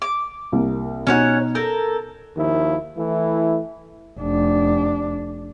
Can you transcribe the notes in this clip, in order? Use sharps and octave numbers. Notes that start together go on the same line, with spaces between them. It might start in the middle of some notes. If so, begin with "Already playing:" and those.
D6
C2 A#3
B2 C#4 D#4 C#5 F#5
A4 A#4 G6
D#2 D#3 F3 E4
E3 A3 E4
F1 D4